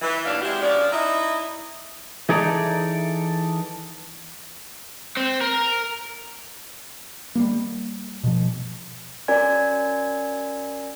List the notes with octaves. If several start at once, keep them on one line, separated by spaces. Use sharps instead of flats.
E3
D#2 B2 F#3 D4 F5
G#3 C4 D4 E4 F#4 G4
F3 C#4 D4 A#4 D5
D#4 E4 D#5 E5
E3 D#4 G#4 A4 D5 A#5
C4
A#4
G3 G#3 A#3
B2 F3
C#4 F#4 A#4 D5 G#5 G#6